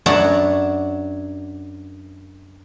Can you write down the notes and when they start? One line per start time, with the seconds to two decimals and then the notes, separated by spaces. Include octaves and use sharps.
0.06 F#2 D4 C#5 F#5 A5 B5